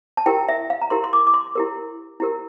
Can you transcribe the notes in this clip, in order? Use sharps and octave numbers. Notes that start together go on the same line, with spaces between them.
A5
E4 G4 A#4 G5
E5
F5
A#5
E4 G4 A#4 C6
C6
D6
D6
C6
E4 G4 A#4
E4 G4 A#4